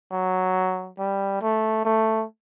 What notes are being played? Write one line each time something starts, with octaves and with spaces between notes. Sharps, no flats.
F#3
G3
A3
A3